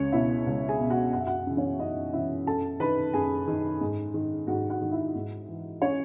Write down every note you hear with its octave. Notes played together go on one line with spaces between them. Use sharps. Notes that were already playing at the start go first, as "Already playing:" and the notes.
Already playing: C#2 C#4 C#5
B2 E4 E5
C#2
G#4 G#5
B2
F#4 F#5
F#2 F#5
E5
F#4 F#5
C#3 E3
C#4 C#5
F#2 D#4 D#5
C#3 E3 E4 E5
F#2 A4 A5
D#3 B4 B5
F#2 G#4 G#5
D#3
G#2
D#3
G#2 F#4 F#5
F#4 F#5
D#3
E4 E5
G#2
E3
C#4 C#5